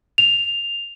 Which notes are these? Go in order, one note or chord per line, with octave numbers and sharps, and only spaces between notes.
F7